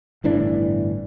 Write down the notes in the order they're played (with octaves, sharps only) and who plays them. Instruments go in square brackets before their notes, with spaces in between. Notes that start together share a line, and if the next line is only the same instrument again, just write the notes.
[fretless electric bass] G1 A2 E3 D4